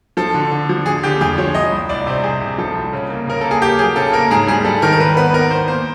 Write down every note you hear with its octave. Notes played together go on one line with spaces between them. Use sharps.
F3 A4
D3
D3
F3
D3 G#4
D3 G4
F2 G#4
F3 C#5
C2 D#5
C2
C2 D5
C3 C5
C3 G#4
C3
F3 A4
C2
C#3
A#3
C#3 A#4
A#3 A4
G#4
A#3 G4
F#3 G#4
C#3 A4
A#3 A#4
G#2 G#4
G3 G#4
G3 A4
D#3 A#4
A#4
G3 B4
B3 B4
B3 A#4
B3 C5
A#3 C5